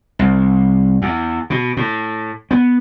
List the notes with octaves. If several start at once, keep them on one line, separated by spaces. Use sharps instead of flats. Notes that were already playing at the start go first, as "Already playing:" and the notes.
C2
E2
B2
A2
B3